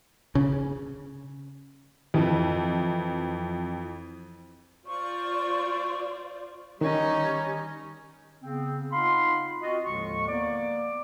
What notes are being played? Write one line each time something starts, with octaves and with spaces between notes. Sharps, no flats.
C#3
F2 E3
F4 C5 D5 C#6
D#3 G3 C#4 D#4
C#3 B3 C4
D#4 F4 F5 F#5 B5 C6
C4 F4 F#4 D#5
D#2 A2 D3 F3 G#3 C#6
A#3 B3 D5 D6